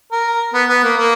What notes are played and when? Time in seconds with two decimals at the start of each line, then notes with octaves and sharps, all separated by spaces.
0.12 A#4
0.54 B3
0.69 B3
0.83 A#3
0.97 A#3